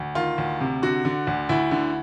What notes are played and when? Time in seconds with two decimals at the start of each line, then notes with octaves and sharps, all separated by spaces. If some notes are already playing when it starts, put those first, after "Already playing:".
Already playing: D2
0.15 D#3 F4
0.38 D2
0.61 C3
0.82 D3 F#4
1.05 D3
1.27 D2
1.49 D2 E4
1.71 D3